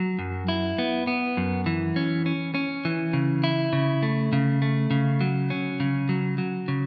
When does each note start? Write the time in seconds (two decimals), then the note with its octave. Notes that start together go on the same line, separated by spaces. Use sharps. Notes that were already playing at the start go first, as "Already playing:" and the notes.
Already playing: F#3
0.19 F#2
0.48 E4
0.78 B3
1.07 B3
1.37 F#2
1.66 E3
1.96 C#4
2.26 C#4
2.54 C#4
2.85 E3
3.13 C#3
3.44 E4
3.73 C#3
4.03 A3
4.33 C#3
4.62 A3
4.91 C#3
5.21 F#3
5.50 C#4
5.80 C#3
6.09 F#3
6.38 F#3
6.68 C#3